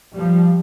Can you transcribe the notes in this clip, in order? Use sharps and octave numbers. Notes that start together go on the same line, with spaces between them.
F3 G3